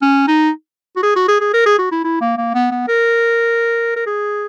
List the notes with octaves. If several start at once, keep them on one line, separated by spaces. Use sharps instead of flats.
C#4
D#4
F#4
G#4
F#4
G#4
G#4
A#4
G#4
F#4
E4
E4
A#3
A#3
B3
B3
A#4
A#4
G#4